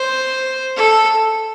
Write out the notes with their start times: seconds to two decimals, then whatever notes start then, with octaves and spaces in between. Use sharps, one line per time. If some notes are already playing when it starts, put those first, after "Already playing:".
Already playing: C5
0.76 A4